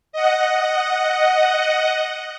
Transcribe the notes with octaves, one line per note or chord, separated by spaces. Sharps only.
D#5 F#5